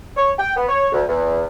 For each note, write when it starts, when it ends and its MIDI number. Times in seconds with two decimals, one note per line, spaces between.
0.17 0.30 73
0.39 0.53 79
0.56 0.64 59
0.68 0.87 73
0.92 1.03 38
1.09 1.45 40